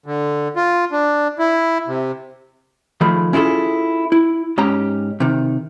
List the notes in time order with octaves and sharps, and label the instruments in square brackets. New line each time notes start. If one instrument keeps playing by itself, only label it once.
[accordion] D3
F4
D4
E4
C3
[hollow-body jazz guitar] D#3 F3 A3 G#4 B5
C#4 E4 F4 G#4 A4
E4
G#2 C#4 G4 A#5
C3 D#3